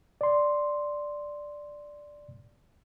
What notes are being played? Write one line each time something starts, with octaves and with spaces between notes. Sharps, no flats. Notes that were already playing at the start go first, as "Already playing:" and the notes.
D5 C6